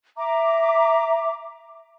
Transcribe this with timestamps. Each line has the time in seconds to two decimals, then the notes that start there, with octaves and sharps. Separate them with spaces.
0.17 E5 A#5 D6